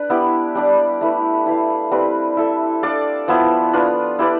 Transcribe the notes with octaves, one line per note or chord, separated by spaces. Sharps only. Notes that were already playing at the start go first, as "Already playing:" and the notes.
Already playing: D4 B4
B3 E4 G4 D5
G3 D4 G4 D5
A3 E4 B4
E4 B4 F5
G3 C4 G4 B4
E4 A4 E5
D4 A4 D5 F5
F3 B3 E4
D4 F4 B4
E4 G4 B4 D5